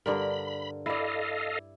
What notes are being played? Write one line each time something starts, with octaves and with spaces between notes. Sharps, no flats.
G2 D3 A#4 B5
E4 A4 D5 D#5 F5